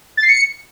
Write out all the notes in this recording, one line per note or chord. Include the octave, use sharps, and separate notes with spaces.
A6
C7
C#7